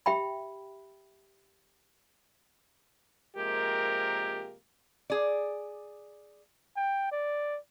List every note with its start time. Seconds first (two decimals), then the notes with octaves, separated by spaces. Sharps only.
0.06 G4 E5 G5 B5
3.37 C3 F3 G#3 A#3 G4 A#4
5.10 G#4 D5
6.77 G5
7.12 D5